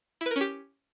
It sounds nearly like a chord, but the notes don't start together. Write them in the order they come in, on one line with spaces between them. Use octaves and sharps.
E4 B4 A#4 C#4 G4